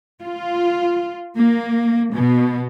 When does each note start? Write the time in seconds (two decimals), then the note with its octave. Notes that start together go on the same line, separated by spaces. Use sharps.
0.21 F4
1.36 A#3
2.12 B2